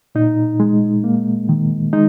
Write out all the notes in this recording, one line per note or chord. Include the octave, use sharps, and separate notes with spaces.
A#2 D#4
G#3
A#3
D#3
G#3 D#4